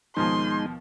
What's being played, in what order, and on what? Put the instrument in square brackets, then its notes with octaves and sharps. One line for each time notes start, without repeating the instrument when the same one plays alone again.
[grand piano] D#2 B2 F3 [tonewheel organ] G#3 D#4 [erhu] C6